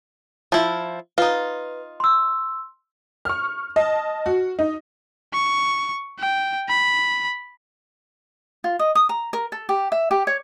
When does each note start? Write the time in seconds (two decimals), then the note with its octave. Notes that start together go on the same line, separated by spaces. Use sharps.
0.52 F3 E4
1.18 D#4 F4 B4
2.00 C6 E6
3.25 C#6 F6
3.76 D#5 A5
4.26 F#4
4.59 D#4
5.33 C#6
6.19 G5
6.68 B5
8.64 F4
8.79 D#5
8.95 D#6
9.09 A#5
9.33 A#4
9.52 A4
9.69 G4
9.92 E5
10.11 G4
10.27 C#5